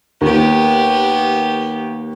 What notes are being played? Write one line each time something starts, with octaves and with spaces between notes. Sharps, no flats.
D#2 B3 G4